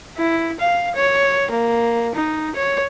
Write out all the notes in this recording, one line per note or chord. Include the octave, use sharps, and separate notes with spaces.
E4
F5
C#5
A#3
D#4
C#5